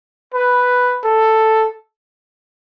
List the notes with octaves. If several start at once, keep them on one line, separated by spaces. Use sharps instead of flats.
B4
A4